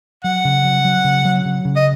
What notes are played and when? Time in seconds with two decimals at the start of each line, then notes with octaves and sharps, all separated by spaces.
0.24 F#3 F#5
0.45 C#3
0.64 F#3
0.85 F#3
1.05 C#3
1.25 F#3
1.45 C#3
1.65 C#3
1.76 D#5